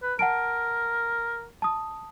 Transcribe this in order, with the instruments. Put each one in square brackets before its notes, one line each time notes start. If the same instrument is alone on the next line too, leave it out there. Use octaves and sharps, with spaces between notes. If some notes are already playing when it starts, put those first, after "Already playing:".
[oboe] B4
[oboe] A#4 [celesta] F#5 A5 D7
[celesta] A5 D#6